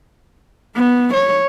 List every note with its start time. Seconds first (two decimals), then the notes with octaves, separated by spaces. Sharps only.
0.75 B3
1.14 C#5